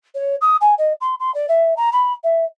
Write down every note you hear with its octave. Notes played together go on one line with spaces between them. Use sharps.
C#5
D#6
G#5
D#5
C6
C6
D5
E5
A#5
B5
E5